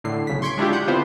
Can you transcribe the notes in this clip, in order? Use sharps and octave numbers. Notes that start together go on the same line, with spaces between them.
A2 D3 C7
B1 C#3 B6
C6 C#6 G#6 B6 D7
G#3 D4 E4 F4 G4
F#5 G6
D3 B3 C4 E4 F4 C5